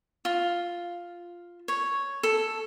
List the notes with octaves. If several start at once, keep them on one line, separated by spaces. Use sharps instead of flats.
F4
C#5
A4